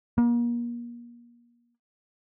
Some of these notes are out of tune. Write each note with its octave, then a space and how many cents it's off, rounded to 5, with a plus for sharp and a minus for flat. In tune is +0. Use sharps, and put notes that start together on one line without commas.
A#3 +35